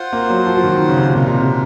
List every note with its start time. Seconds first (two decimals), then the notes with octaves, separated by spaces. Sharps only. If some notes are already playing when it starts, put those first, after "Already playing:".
Already playing: F4 C5 F#5
0.13 A#3
0.30 F#3
0.47 F3
0.57 F3
0.64 D#3
0.89 C#3
0.97 C3
1.08 C3
1.14 A#2 G#3 D#4 A#4
1.26 C3